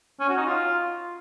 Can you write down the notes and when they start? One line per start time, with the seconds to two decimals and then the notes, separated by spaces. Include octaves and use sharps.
0.20 C#4
0.29 F#4
0.38 D#4
0.46 F4